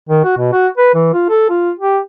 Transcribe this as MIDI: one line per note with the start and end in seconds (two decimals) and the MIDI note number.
0.09 0.23 51
0.24 0.35 66
0.38 0.52 47
0.53 0.68 66
0.78 0.93 71
0.95 1.13 52
1.13 1.27 65
1.29 1.49 69
1.50 1.71 65
1.79 1.99 67